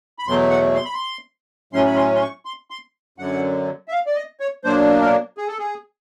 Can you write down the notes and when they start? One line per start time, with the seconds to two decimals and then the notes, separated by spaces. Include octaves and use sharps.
0.19 B5
0.27 E2 B2 F#3 A3 C6
0.51 F#5
0.75 C6
0.85 B5
0.94 C6
1.73 A2 F#3 A3 C#4 C6
1.87 B5
1.96 C6
2.15 C6
2.21 C#6
2.45 C6
2.71 C6
3.18 F#2 D3 F#3 F#5
3.88 E5
3.92 F5
4.06 D5
4.15 D#5
4.40 C#5
4.64 B2 F#3 A#3 D4 C5
5.01 A#4
5.37 G#4
5.48 A4
5.59 G#4